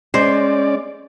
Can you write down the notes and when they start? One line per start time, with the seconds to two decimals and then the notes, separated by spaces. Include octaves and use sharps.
0.14 G#3 C#4 C5 D5